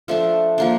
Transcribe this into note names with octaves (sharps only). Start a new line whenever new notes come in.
F3 A3 D4
F3 A#3 D4